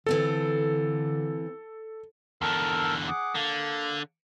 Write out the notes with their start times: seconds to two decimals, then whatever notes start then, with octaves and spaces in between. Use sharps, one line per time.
0.06 D3 E3 C4 F4 A4
2.42 E2 D3 A4 A#4 E6
3.08 G#4 F#5 D6
3.35 D3 A#3